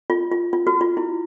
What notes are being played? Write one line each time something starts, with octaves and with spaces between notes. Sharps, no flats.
F4
F4
F4
F#4
F4
E4